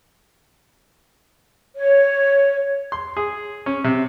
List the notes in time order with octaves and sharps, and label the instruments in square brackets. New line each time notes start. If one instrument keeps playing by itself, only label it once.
[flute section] C#5
[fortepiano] C6
G#4
C#4
C3